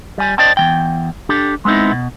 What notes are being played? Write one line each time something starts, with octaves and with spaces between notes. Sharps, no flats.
G3 G#5
C5 D5 D#5 G5 A5
E2 F3 G5
D4 G4 A4
G#3 B3 C4 D#4 E4
B2